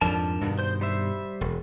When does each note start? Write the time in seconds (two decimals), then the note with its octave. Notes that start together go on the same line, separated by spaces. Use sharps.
0.01 F2 G#2 F3 D4 A#4 A5
0.41 G2 B2 D#3
0.59 C5 G6
0.81 G3 C5 E5
1.41 E1